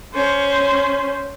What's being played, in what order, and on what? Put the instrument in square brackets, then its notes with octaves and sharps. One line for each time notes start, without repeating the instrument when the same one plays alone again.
[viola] C#4 C5